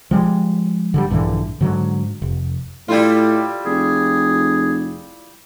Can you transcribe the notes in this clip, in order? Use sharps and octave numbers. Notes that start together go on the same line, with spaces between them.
F3 G3 G#3
D3 E3 G3
A#1 G2 D3 E3
G#2 D3 F#3
F1
A2 G3 E4 F4
F1 G#4